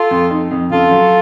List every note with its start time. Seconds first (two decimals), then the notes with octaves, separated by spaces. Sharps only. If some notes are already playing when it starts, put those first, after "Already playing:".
Already playing: F4 A4
0.11 F2
0.30 D#4
0.51 F2
0.70 C#3 F4 A4
0.91 F#3